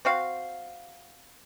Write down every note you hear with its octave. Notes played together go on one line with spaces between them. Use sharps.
C4 F#4 F5